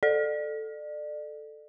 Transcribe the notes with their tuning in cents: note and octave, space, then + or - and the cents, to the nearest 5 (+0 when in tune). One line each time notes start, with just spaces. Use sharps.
A4 +0 D5 +30